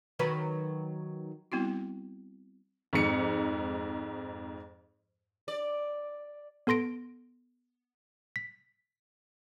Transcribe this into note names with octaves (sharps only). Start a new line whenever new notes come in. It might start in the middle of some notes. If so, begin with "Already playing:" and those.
D#3 F#3 B4
G3 B3 C4 E4 F#4
F2 G#2 C#7
D5
B3 A4 C6 A#6 D7
B6